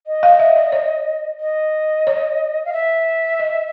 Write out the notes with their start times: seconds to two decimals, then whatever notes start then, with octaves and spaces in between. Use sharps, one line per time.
0.06 D#5
0.23 F5
0.39 E5
0.56 D5
0.72 C#5
1.40 D#5
2.07 C#5
2.65 F5
2.73 E5
3.39 D#5